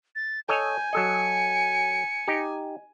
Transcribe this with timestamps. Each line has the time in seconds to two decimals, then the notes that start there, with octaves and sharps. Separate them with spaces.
0.16 A6
0.49 A4 C#5 D#5 G#5 G6
0.93 F#3 A4 D#5 C#7
2.28 D#4 G4